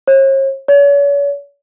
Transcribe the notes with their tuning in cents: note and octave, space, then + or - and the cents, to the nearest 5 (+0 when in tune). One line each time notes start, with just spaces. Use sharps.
C#5 -45
C#5 +40